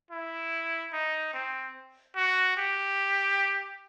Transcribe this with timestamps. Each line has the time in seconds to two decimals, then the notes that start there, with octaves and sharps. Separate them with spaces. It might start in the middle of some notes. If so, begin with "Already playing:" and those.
0.11 E4
0.93 D#4
1.34 C4
2.16 F#4
2.57 G4